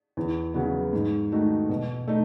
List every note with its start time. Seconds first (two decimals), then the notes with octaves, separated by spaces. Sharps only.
0.17 E2
0.54 C#3 F#3 B3
0.93 G#2
1.32 D#3 A3 D#4 F#4
1.70 B2
2.08 A3 D#4